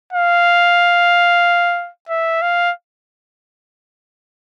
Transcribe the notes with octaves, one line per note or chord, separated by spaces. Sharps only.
F5
E5
F5